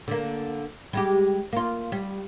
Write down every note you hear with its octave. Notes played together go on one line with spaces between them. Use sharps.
D3 A#3
G3 G#3 G4
A#3 F4
G3